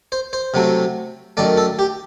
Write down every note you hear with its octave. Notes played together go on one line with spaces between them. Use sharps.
C5
C5
C3 F#3 A3
F#2 D#3 A3 D5
A4
G4